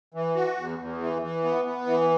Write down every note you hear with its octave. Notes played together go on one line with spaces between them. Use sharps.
E3
F#4
E2
E2
E3
E3
B3
B3
E3